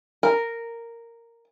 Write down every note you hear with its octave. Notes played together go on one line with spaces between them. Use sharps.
A#4